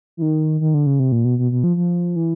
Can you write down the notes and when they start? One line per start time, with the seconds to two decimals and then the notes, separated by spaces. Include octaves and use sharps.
0.17 E3
0.22 D#3
0.61 D#3
0.74 D3
0.86 C#3
1.00 C3
1.12 A#2
1.25 B2
1.39 B2
1.52 B2
1.64 F3
1.77 F3
2.16 E3